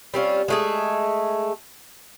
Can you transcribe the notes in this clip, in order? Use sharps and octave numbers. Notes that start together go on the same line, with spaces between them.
G3 C4 C#4 F4
G#3 A3 G#4